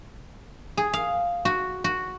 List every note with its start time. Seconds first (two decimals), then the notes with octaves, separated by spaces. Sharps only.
0.77 G#4
0.93 F5
1.45 F#4
1.84 F#4